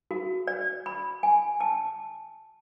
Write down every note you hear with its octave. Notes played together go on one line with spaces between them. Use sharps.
F#4
D5
B5
G#5
A5